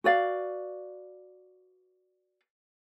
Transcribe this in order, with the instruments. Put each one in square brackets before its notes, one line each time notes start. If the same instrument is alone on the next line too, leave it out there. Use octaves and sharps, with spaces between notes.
[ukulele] F#4 B4 D5 F5